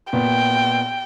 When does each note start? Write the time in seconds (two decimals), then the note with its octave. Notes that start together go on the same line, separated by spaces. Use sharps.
0.13 A#2 B3 G5